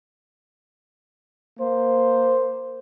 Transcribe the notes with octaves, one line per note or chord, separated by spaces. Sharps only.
A#3 C5